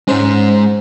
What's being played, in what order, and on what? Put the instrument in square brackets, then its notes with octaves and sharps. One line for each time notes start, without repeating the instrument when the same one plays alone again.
[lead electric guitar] G#2 G#3 [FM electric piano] C#4 C5